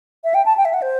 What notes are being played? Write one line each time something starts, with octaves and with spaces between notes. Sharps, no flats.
E5
G5
A5
G5
E5
F#5
C5